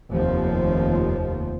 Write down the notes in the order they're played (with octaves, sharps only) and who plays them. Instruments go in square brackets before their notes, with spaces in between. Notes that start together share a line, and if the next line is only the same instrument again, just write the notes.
[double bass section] F1 D#2 F3